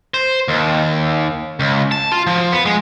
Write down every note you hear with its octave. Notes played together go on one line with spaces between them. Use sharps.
C5
D#2
C#2
A5
F4
F3
B3
G#3